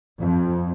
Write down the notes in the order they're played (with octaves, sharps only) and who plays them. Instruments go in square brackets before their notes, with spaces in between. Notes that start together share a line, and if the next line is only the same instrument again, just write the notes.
[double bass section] F2